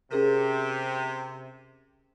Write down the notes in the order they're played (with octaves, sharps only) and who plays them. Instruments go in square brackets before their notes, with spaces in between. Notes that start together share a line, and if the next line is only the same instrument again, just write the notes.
[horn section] C3 [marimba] C#4 G#4 A#4